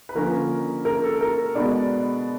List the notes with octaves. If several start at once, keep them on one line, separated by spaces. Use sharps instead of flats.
B4
D3 F3 A#3 C#4 A#4
A#4
A4
A#4
B2 G#3 B3 D4 D5